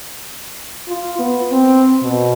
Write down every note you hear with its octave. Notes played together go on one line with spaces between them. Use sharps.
F4
B3
C4
B2